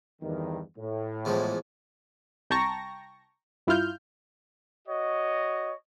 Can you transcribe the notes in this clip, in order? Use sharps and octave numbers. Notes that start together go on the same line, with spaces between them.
E2 G2 D#3
A2
E2 G#2 F3
C2 G5 A5 A#5 C#6 A#6
G2 E4 F4 F6 G6
F#4 C#5 D#5